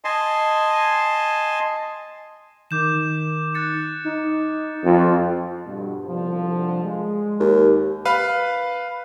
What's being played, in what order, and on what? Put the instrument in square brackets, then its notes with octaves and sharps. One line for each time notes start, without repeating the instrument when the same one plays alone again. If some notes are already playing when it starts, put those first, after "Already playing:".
[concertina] D#5 G#5 A5 C6
[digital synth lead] D#3 [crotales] D6 G6 E7
[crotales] F#6 A6 C#7
[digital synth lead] D#4
[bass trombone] F2 [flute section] F4
[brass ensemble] G2 B2
C2 D3 F3
G#3
[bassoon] D#2
[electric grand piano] B4 F5